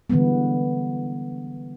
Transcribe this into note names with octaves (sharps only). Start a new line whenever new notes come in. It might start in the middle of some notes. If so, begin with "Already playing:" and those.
D3 E3 G3 G#3 B3